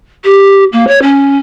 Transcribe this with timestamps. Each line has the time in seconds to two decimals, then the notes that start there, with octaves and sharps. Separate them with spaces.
0.25 G4
0.73 A#3
0.88 C#5
1.02 C#4